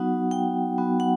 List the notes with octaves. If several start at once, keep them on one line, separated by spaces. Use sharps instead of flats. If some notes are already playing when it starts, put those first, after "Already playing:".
Already playing: F#3 B3 D#4 F#4 F#5
G5
F#3 B3 D#4 F#4
F#5